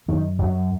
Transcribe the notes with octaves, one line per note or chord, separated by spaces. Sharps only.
F#2 D#3
F#2 F#3